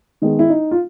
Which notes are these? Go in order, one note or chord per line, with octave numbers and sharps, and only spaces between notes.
D#3 G#3 B3
E4
D#4
F4